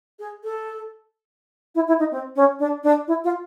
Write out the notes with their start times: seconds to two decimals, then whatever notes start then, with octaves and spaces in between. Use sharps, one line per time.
0.19 G#4
0.43 A4
1.75 E4
1.88 E4
1.99 D#4
2.11 C4
2.36 C#4
2.59 D4
2.83 D4
3.07 E4
3.24 F4